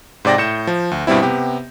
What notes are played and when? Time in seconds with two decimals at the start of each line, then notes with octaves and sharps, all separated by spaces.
0.25 G#2 C3 D5 G5 A#6
0.38 A2 G6 C#7 E7
0.67 F3
0.91 D2
1.07 G2 B2 G3 C4 E4
1.22 C3 B3 G4